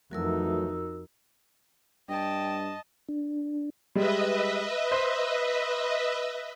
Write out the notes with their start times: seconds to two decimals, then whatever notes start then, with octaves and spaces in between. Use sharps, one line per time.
0.11 F2 E3 F#3 A3 D#4 F#4 A#4 E6
2.09 G2 D#5 G5 A5
3.09 D4
3.95 G3 G#3 B4 D#5 E5
4.92 C5